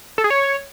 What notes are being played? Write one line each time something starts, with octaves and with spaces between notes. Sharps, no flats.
A4
G#4
C#5